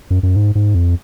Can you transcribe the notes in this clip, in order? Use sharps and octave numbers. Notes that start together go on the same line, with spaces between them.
F#2
F#2
G#2
G#2
F2